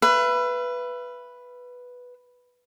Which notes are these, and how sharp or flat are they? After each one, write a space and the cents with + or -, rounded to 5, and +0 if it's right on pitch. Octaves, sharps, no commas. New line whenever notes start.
B4 +0 E5 +40